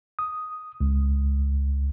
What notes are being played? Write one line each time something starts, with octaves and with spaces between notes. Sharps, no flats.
D#6
C#2